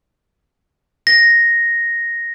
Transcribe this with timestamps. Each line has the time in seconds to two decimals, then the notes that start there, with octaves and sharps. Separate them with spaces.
1.07 A#6